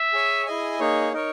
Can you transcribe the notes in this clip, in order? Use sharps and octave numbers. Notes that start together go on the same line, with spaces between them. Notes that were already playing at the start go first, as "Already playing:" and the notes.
Already playing: E5
G#4 C#5 G#5
E4 G#4 D#5 G#5
A#3 D#4 G#4 C#5
D#4 A#4 C#5